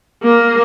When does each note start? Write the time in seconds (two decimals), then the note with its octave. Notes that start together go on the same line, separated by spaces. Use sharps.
0.23 A#3